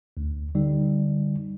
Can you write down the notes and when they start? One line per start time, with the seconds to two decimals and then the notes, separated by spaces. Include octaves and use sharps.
0.17 D2
0.55 D3 G3 D#4